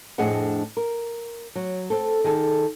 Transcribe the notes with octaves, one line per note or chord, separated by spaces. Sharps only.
F2 A2 D4 G#4 D#5 F#5
A#4
F#3
C4 A4
D#3 G#4 A4